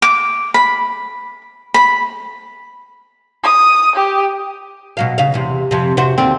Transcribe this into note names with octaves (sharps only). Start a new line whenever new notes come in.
D6
B5
B5
D#6
G4
B2 F#3 F5
C#3 F5
E2 C3
F2 C3
C3 F#4 C5
D#2 D3 C4